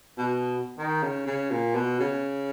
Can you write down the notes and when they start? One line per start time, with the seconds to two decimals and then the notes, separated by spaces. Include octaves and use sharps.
0.17 B2
0.78 D#3
1.03 C#3
1.27 C#3
1.51 A#2
1.75 B2
2.00 C#3